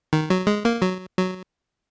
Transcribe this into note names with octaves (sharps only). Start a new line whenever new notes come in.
D#3
F#3
G#3
A#3
F#3
F#3